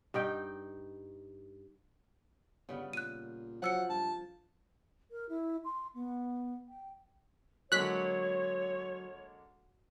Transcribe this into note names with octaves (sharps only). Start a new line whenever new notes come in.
G2 D#4 G5
G1 C#3 G3 B3
A#2 F#6 D#7
F3 F#3 C5 F#5 E6 C#7
G2 A5
A#4
E4
C6
B3
G5
D3 F#3 G#3 A#3 C#5 F#6 B6